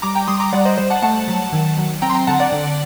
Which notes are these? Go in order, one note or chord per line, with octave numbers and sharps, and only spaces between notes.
G3 A#5 D6
G5 A#5
G3 C6 D#6
A#5 D6
G3 D5 F#5
C5 D#5
G3 C5
F#5 A5
A3 F#5 A5
F#3
D#3
F#3
C4 G5 A#5
C6
G5 A#5
D3 F#5 A5
D5 F#5
D3